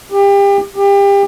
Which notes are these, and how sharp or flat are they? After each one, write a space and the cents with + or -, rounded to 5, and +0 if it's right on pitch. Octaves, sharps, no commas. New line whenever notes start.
G4 +30
G4 +30